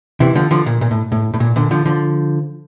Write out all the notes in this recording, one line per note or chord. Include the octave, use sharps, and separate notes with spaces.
C3 E3
D3 F3
D3 F3
A#2
A#2
A2
A2
A2
A#2
A#2 D3
D3 F3
D3 F3